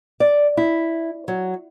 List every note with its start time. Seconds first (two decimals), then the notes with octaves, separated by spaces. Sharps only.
0.20 D5
0.57 E4
1.28 F#3